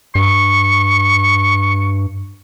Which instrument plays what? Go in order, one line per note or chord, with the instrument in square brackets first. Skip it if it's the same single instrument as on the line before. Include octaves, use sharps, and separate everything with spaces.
[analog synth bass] G2 [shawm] C#6